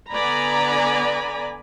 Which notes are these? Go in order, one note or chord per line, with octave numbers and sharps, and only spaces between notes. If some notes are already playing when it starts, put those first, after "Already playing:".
D3 B3 D5 G#5 A#5 B5